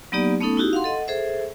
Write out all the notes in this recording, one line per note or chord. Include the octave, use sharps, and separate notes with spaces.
F#3 A#3 B3 D#4 G4 D5
A3 B3 C#4 D#4 A4
D#4 E4 F#4 G4
F5 F#5 C6
A4 D#5 F#5
G#4 A4 C5 E5